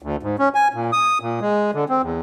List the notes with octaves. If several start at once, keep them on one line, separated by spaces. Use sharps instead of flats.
D2
G#2
C#4
G#5
A#2
D#6
A#2
G#3
D3
C4
E2